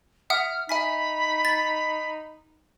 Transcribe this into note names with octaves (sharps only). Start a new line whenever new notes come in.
E5 F#5 D#6 F6
D#4 E5 G#5 B5 B6
A6